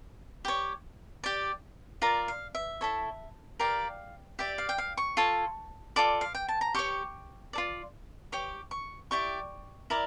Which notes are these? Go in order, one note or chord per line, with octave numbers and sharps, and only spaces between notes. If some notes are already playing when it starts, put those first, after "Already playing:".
G4 C#5
G4 D5
F4 A#4 D5 A#5
F5
E5
E4 A4 C#5
G4 A#4 D5 F5
G4 D5 E5
F5
G5
F5
C#6
F4 A4 C#5
F4 A4 D5 D6
F5
G5
A5
A#5
G4 C#5 C#6
F4 A4 D5
G4 C#5 D6
C#6
E4 G4 D5 C#6
E4 A#4 D5